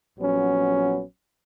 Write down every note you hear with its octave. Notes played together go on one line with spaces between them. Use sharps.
A#1 F#3 B3 C#4